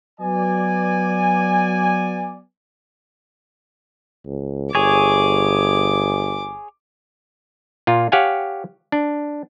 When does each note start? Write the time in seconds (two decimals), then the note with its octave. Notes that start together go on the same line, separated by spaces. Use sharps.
0.20 F#3 B3 D5 G#5
4.26 C#2
4.75 G1 G#4 C#5 D6
7.87 A#2 F4
8.12 G4 C#5 F5 F#5 G#5
8.92 D4